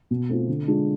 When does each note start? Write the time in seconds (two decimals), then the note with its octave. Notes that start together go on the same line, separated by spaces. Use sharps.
0.11 B2
0.29 A3 C4 F4
0.48 D3
0.67 G#3 D4 F4